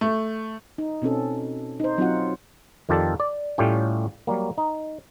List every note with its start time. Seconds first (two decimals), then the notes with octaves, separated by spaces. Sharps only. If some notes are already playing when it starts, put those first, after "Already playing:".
0.01 A3
0.78 D#4
1.02 B2 C4 C#4 A4
1.80 D#4 C5
1.98 F#3 C4 D#4 F4 F#4 F#5
2.89 F2 D#3 F4 G4 A4 D5
3.20 D5
3.58 A2 G3 A3 C#4 F4 G4
4.27 F#3 G3 A#3
4.58 D#4